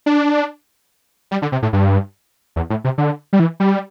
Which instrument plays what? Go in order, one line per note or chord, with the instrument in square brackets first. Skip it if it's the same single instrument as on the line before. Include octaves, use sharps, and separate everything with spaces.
[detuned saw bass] D4
G3
D3
C3
A2
G2
E2
A2
C3
D3
G3
E3
G3